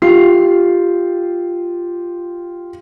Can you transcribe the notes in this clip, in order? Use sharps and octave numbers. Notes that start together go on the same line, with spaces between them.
F4 G4 C7